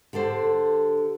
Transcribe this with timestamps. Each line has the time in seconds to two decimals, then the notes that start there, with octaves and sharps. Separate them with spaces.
0.13 D3 G4 A4 C5